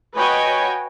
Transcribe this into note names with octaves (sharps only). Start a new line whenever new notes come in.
F#4 B4 C#5 D#5 G5 G#5